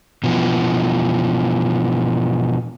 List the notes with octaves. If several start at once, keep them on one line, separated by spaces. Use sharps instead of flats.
B2 E3 F3